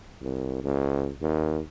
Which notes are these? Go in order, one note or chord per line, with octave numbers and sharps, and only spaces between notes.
C2
C#2
D#2